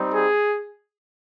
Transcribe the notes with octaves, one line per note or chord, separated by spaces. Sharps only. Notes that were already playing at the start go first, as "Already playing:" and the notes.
Already playing: G3 C4 D#4
G#4